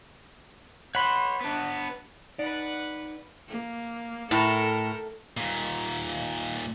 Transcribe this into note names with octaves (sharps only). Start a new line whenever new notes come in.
C#5 F#5 B5 C6
B3 D4
D#4 B4 D5 F#5
A#3
A2 A4 A#4
D#2 A#2